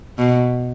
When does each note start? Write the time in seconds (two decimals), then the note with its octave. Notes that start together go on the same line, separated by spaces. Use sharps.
0.18 B2